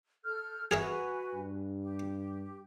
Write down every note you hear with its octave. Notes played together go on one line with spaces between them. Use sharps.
A4 F6 G6
F#4 G#4 A#4 B4 E5 G#5
G2
G4